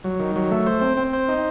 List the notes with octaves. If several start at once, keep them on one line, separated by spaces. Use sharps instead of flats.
F#3
D#3
F#3
A3
C5
C4
C4
C5
D#4